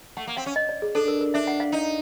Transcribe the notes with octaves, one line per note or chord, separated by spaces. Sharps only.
A3 F#5
A#3
C4 F5
C#4
D#5
D5
G#4
D4 A4
A#4
A#4
D4 E5
F#5
F5
D#4